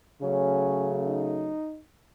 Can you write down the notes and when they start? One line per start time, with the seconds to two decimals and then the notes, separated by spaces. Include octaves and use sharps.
0.21 C#3 F#3 A3 C#4
1.05 D#4